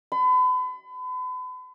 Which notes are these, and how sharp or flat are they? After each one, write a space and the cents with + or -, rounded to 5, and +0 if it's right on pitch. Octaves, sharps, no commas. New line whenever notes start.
B5 +40